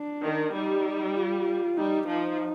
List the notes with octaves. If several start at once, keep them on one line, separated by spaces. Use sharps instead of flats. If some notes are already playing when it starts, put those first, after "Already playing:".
Already playing: D4
D#3
G3 D#4
F4
G3 D#4
F3 D#4